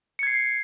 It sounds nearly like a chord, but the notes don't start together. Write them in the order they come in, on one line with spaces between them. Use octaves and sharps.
C#7 G#6 C7